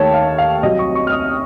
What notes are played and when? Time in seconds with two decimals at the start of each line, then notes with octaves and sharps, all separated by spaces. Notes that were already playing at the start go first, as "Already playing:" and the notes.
Already playing: D#2 D#3 A3 C#5 A5
0.14 F5
0.38 F5
0.63 C2 C3 F#3 D#5
0.79 C#6
0.95 C#6
1.07 F6
1.12 D#6